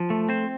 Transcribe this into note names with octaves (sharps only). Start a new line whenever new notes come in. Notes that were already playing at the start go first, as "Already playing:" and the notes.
Already playing: F3
A3
C4 C5